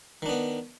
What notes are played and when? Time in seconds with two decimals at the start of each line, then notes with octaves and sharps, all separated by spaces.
0.22 D#3
0.26 D4
0.29 B3